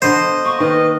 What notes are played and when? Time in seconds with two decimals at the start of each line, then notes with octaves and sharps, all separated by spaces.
0.02 D3 B3 C5 D#5
0.45 A#3 C#6
0.60 D#3 B4 D#5